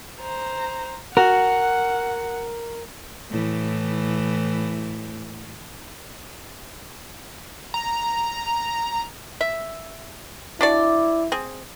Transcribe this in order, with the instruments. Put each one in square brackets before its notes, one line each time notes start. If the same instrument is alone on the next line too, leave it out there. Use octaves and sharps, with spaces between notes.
[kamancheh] C5 A#5
[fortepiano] F#4 [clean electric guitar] A#4 [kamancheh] F#5
[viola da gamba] A2 E3
[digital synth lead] A#5
[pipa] E5
[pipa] D4 F#4 D5 [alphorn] E4
[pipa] C4 G#4